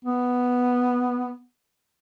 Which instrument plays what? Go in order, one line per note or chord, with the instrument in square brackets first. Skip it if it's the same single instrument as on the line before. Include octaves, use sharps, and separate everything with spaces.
[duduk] B3